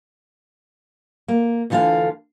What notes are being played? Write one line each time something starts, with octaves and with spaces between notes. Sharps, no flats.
A#3
D2 D3 E3 F4 A4 F5